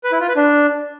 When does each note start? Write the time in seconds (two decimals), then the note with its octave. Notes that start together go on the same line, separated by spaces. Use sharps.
0.04 B4
0.12 E4
0.20 F4
0.28 B4
0.36 D4